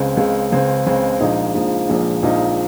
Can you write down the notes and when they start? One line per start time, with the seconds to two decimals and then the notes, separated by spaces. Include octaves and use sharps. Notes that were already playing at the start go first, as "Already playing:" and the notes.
Already playing: C#2 C#3 G#3 C4
0.17 C#2 C#3 G#3 C4
0.52 C#2 C#3 G#3 C4
0.86 C#2 C#3 G#3 C4
1.20 A#1 A#2 F3 G#3 D#4
1.54 A#1 A#2 F3 G#3 D#4
1.89 A#1 A#2 F3 G#3 D#4
2.23 A#1 A#2 F3 G#3 D#4